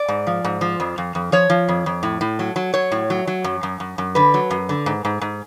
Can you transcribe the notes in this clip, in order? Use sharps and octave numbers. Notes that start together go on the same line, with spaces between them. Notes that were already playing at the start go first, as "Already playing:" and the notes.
Already playing: D5
G#2
F3
G#2
F3
F2
F2
F2
F3 C#5
F3
F2
F2
A2
A2
F#3
F#3
F#3 C#5
A2
F#3
F#3
F#2
F#2
F#2
F#2
D3 B4
F#3
F#2
D3
G#2
G#2
G#2